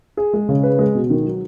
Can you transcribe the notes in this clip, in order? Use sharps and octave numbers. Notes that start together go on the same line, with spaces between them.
G#4
G#3
C#3
B4
G#3
B2
D#3
F#3